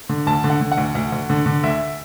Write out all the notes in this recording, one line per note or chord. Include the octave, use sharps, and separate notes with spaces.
D3
D2 A5
D3
F#5
D3
F#5
D2
D2
D2
D3
D3
D2 E5